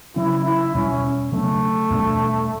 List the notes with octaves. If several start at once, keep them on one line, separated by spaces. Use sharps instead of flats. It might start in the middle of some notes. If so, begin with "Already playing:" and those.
C#3 F#3 C#4 E4
E4
E2 B2 G3 C#4
C#3 F#3 A3 B3 D4
E2 B2 G3 D4